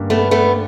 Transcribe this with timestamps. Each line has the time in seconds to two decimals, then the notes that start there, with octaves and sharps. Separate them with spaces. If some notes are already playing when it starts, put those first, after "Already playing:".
Already playing: G2 D3 G3 A#3 C#4
0.10 A3 B3
0.31 A3 B3